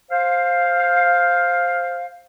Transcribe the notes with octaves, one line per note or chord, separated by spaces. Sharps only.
C5 F5